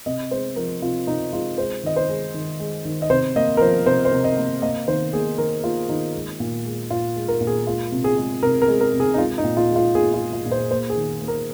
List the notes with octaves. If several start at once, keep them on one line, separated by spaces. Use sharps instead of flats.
C3 D#5
G#3 C5
F3 A#4
C3 F4
C3 D#4
G#3 F4
G#3 C5
D#3 D#5
C5
G#3
D#3
G#3
D#3
D#5
C3 C5
A#3 D#5
A#4
F3 C5
C3 C5
C5
C3
D#5
A#3
A#3 D#5
D#3 C5
A#3 G#4
D#3 A#4
A#3 F4
D#3 D#4
G#3
A#2
G#3
A#2 F4
G#3
A#4
A#2
G#4
G#3 F4
C3
G#4
G#3
C3 A#4
A#4
G#3
A#4
C3
G#4
D#4
G#3 F4
D#4
A#2
F4
G#3
F4
A#2 G#4
F4
G#3
F4
A#2
C5
A#3 C5
G#4
D#3
A#3
A#4